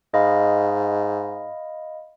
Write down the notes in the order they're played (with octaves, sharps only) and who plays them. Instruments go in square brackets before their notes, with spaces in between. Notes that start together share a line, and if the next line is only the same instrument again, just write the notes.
[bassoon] G#2 [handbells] D#5 F5 B5